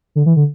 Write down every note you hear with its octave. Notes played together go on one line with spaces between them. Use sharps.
D3
E3
D3